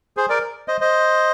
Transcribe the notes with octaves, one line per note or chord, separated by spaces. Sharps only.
G#4 C5
A#4 D5
C5 D#5
C5 D#5